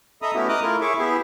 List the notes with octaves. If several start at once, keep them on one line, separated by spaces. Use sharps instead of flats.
A4 D#5 E5 A#5 B5 D#6
A3 B3 C#4 E4 F#4 G4
D#5 A#5 D6 D#6 F6 F#6
A3 E4 F4 A#4
E4 G#4 C#5 E5 C#6 D6
B3 E4 G4 G#4 E5